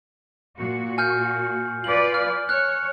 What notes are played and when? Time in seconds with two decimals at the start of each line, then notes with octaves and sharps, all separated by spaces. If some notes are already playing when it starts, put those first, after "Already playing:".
0.57 A#2 F#4
0.98 G#5 F6 G6
1.84 F4 B4 D5 F#7
2.14 F6
2.49 C#5 F6 F#6